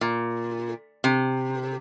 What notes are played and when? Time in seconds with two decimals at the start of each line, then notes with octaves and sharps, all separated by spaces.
0.01 A#2
1.04 C3